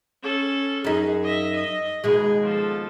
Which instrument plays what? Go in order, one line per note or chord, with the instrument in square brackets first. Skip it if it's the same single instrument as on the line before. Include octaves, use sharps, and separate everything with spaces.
[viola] C#4 A4
[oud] F#2 D#4 [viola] G#4
[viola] D#5 E5
D#5
[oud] D#2 B2 G#3 [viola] G#4
[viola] F3 A4